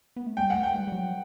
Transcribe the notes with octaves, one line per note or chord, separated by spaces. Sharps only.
B3
A3
G3 G5
F#5
A3
G5
G3
G3
F#3